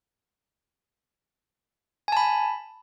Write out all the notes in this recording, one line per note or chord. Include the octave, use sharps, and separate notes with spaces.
G#5 A5 B5